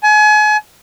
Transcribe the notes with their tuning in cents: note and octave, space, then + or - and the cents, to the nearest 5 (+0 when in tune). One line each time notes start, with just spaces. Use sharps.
G#5 +35